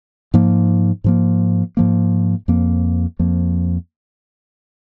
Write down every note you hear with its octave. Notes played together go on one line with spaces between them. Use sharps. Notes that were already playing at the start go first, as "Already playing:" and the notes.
G#2 F3 A#3
G#2 F3 A#3
G#2 F3 A#3
F2 F3 A#3
F2 F3 A#3